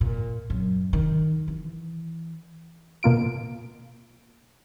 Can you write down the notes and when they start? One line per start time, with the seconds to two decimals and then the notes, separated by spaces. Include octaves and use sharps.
0.01 A#2
0.50 F#2
0.93 D#3
1.48 E3
3.03 B2 A#3 F4 D7